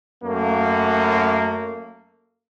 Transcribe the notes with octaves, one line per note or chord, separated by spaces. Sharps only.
F#2 A3 A#3